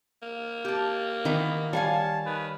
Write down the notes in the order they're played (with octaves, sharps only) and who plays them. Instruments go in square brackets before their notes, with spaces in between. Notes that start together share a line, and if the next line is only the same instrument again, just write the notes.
[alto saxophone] A#3
[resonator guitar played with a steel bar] G4 A5
[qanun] D#3 D#5 D6 [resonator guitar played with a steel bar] E3 B3
[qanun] G3 [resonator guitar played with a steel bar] C#5 F5 G#5 [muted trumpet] A5
[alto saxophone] D#3 [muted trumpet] B4